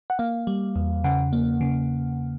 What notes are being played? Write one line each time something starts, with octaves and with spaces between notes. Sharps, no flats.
F#5
A#3 F5
G3
E2
C#3 F#5
A#3
C#3